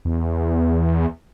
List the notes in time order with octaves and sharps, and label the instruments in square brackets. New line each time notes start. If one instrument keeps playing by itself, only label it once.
[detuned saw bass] E2